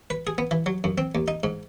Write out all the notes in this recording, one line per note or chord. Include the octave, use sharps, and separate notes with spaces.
B4
G#4
B3
E3
F#3
F#2
C4
D#2
D#4
G#2